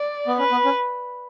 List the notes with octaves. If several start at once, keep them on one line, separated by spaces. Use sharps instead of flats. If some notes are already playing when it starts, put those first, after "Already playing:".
Already playing: D5
B3
C#4 B4
B3
C#4